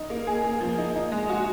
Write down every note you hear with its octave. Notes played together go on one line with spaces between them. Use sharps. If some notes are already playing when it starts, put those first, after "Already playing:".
Already playing: D#4
A#3
G#4
A#3
F3
D#4
D#4
G#3
F#4